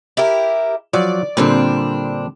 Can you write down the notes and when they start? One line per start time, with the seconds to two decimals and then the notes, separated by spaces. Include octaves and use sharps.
0.17 E4 G4 A#4
0.93 F3 F#3 D5
1.37 A#2 D3 G3 C4 D4